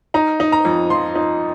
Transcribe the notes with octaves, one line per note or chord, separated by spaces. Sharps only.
D#4 A#5
D#4
A#5
F2
F3 C6
D#4